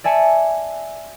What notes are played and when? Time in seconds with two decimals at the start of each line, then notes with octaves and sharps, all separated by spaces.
0.04 D5 E5 G#5 A5 C#7